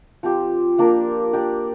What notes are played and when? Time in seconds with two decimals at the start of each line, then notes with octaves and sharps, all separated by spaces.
0.23 F3 C4 G4
0.78 F3 A#3 D4 A#4
1.33 D4 G4 A#4 D5